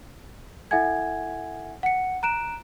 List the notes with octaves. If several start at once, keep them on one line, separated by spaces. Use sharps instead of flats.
E4 A4 E5 F#5 G#5 G#6
F#5 C#7
A#5 F#6 D7 E7